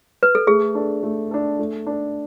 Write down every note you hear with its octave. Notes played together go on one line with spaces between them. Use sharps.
B4
A4
A3 G#4
D4 A4
A3
D4 A4
A3
D4 A4